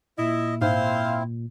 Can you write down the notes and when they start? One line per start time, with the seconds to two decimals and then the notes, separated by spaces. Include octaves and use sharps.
0.18 A#2 E4 D#5
0.62 G#2 C4 E4 C5 F5